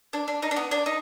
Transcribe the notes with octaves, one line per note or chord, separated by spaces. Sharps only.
D4
D4
D#4
D4
B3
D4
D#4